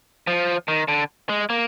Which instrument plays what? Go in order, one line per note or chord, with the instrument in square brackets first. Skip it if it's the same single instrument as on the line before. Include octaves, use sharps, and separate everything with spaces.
[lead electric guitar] F3
D#3
D3
G#3
A#3